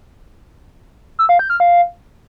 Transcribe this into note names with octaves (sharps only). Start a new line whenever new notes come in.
E6
F5
G6
F6
F5